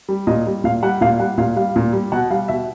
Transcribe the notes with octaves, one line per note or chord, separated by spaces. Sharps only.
G3
A#2 D#5
G3
A#2 F5
G3 F#5
A#2 F5
G3 F#5
A#2 F5
G3 F5
A#2
G3
B2 F#5
G3 F5
B2 E5